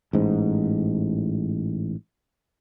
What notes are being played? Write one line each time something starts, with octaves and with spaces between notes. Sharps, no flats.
A1 G#2